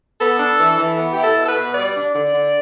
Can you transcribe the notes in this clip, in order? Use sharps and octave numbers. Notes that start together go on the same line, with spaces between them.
B3 A4
D4
E3
E3
B3
E4 G4
A4
B2
A4
B4
B2
G3 D5
D4
D3
D3